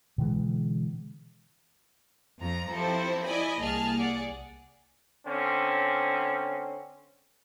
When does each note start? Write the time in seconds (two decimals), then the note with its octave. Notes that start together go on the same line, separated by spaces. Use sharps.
0.18 B2 D3 E3 G#3
2.41 F2 F3 A#5
2.71 F3 C4 E4 G4 A4 C5
3.25 E4 D5 D#5 G#5 B5
3.61 C2 A#3 G#4 A5 F6
3.98 G#4 D5 F#5
5.26 D3 C4 C#4